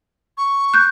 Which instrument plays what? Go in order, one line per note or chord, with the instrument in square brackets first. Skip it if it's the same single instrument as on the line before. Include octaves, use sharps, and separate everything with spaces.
[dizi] C#6
[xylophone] F#6 G6